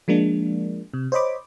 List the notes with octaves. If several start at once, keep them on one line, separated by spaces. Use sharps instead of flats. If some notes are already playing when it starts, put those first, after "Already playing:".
F3 G#3 A#3 D4
C3
C5 C#5 D#5 B5 D6